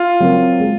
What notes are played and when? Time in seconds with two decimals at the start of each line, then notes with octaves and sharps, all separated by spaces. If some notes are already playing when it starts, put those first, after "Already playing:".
Already playing: F4
0.20 F#3 C4 F#4 A#4
0.60 G#3